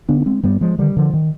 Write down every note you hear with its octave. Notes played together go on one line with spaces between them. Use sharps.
D3 B3 D4
D4
G#3 C4
G2 G3 B3
F3 G#3
D3 D#3 G3
D3 F3
D#3